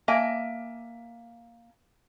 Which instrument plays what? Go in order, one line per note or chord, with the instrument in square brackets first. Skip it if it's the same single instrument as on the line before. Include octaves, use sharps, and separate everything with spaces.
[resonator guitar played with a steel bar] A#3 E5 G#5